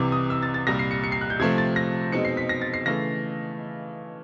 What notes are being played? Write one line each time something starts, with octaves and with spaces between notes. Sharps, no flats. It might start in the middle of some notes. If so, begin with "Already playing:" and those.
Already playing: C2 C3 E3 D6
D#6
E6
A6
A6
C2 A#2 G3 A#6
C7
C#7
C#7
C7
F#6
G6
C3 F3 A3 C4 G#6
A6
A#6
B2 G#3 C4 D#4 C#7
C7
B6
A#6
A6
C7
C#3 E3 A3 A#6